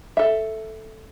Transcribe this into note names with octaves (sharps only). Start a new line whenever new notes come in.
A4 E5